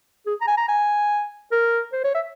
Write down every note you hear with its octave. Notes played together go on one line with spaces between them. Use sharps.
G#4
A#5
G#5
A#5
G#5
A#4
C5
C#5
E5